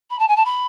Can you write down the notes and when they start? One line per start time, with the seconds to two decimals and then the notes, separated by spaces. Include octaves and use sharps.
0.10 B5
0.19 A5
0.28 G#5
0.36 A5
0.45 B5